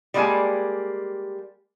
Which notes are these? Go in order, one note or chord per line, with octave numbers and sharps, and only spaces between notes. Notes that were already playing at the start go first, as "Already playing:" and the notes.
G3 G#3 A#3 F#4 G#5 A5